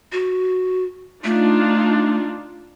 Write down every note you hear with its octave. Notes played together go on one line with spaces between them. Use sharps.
F#4
A3 D4 D#4 F4